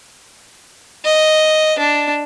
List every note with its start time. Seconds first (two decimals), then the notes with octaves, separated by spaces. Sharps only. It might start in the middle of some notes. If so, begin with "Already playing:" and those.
1.05 D#5
1.79 D4